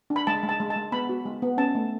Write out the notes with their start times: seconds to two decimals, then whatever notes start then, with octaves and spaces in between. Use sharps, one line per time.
0.10 D4
0.16 B5
0.27 G#3 A5
0.43 G#3
0.49 A5
0.60 G#3
0.70 A5
0.76 G#3
0.92 B3 B5
1.09 F#4
1.26 G#3
1.42 B3
1.58 C#4 A5
1.75 A3